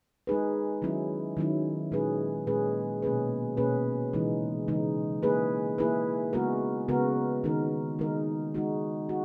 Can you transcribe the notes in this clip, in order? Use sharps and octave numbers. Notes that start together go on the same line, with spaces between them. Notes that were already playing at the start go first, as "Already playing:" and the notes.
G#3 D#4 G#4 B4
D#3 F#3 C#4 E4
D#3 F#3 C#4 E4
A#2 G#3 C#4 G#4 B4
A#2 G#3 C#4 G#4 B4
B2 A#3 C#4 G#4 B4
B2 A#3 C#4 G#4 B4
C#3 E3 G#3 D#4
C#3 E3 G#3 D#4
A#3 E4 G#4 B4
A#3 E4 G#4 B4
C#3 G#3 B3 F#4 A#4
C#3 G#3 B3 F#4 A#4
D#3 G#3 D#4 A#4
D#3 G#3 D#4 A#4
G#3 D#4 F#4
F#4